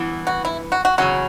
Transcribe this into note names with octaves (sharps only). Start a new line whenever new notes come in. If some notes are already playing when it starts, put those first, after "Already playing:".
Already playing: G2 E3 B3
F#4
E4
F#4
F#4
E2 C#3 F#3 C#4 F#4